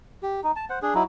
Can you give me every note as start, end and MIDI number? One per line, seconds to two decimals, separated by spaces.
0.23 0.40 67
0.44 0.52 63
0.56 0.65 81
0.70 0.79 72
0.70 0.79 78
0.82 0.94 62
0.82 0.94 68
0.95 1.03 54
0.95 1.03 63
0.95 1.03 64